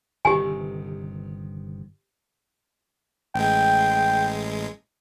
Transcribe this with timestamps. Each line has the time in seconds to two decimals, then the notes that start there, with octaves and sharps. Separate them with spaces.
0.25 G1 C3 D#3 G4 G#5
3.35 A1 G#3 G5